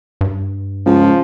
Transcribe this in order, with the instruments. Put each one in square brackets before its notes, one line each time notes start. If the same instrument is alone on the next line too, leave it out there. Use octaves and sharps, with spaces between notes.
[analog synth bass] G2
[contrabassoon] C#2 [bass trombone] F3